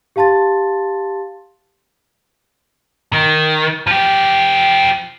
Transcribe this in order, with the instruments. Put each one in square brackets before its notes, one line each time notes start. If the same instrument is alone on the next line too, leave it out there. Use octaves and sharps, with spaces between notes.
[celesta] G4 F5 A5 C6 A6
[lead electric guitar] D#3
F3 G4